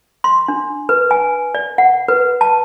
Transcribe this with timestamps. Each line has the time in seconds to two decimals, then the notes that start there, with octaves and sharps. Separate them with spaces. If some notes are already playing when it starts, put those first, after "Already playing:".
0.24 C6
0.48 D4
0.89 B4
1.11 G#5
1.55 D5
1.78 F#5
2.08 B4
2.41 A5